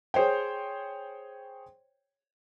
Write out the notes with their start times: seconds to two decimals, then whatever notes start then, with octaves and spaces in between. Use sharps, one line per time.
0.14 G#4 C5 C#5 G5